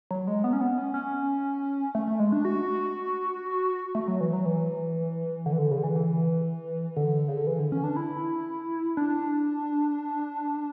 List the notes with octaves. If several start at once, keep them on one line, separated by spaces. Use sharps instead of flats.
F#3
G#3
B3
C#4
B3
C#4
C#4
A3
A3
G#3
D4
F#4
A3
F#3
E3
F#3
E3
D3
E3
D3
C#3
D3
E3
E3
D3
C#3
D3
E3
D3
C#4
D4
E4
D4